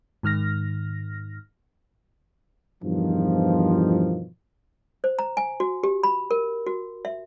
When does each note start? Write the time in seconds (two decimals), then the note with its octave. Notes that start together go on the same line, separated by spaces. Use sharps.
0.23 G#2 D#3 F6 A#6
2.83 E2 G2 B2 D#3 F3
5.04 C5
5.19 A#5
5.37 G#5
5.60 F#4
5.83 G4
6.03 B5
6.31 A#4
6.67 F#4
7.05 E5